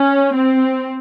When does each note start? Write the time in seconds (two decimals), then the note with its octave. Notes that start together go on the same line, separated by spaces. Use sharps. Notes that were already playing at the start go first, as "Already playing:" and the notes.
Already playing: C#4
0.35 C4